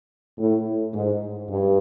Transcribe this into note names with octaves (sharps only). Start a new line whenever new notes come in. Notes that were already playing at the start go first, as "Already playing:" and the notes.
A2
G#2
G2